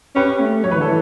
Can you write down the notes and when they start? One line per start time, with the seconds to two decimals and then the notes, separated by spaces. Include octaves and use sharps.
0.16 C#4 G4 B4
0.40 A3
0.64 F#3 C#5
0.71 E3 B4
0.78 D3
0.81 A4
0.86 E3